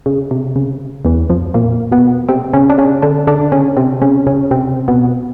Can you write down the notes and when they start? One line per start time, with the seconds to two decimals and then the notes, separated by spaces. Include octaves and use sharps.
0.06 C#3
0.31 C3
0.56 C#3
1.05 E2 E3
1.30 F2 F3
1.54 A#2 A#3
1.91 B2 B3
2.29 C3 C4
2.53 C#3 C#4
2.70 D4
2.78 C#3 C#4
3.02 D3 D4
3.27 D3 D4
3.52 C#3 C#4
3.77 C3 C4
4.02 C#3 C#4
4.26 C#3 C#4
4.51 C3 C4
4.88 B2 B3